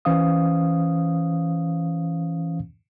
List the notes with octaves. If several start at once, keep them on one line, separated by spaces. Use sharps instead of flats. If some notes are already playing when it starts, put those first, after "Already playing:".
E3 C#4 C5 F5 D#6